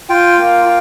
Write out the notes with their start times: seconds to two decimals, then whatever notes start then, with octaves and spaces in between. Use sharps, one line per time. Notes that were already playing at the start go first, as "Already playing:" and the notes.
0.09 F4 G5
0.37 A#3
0.65 F4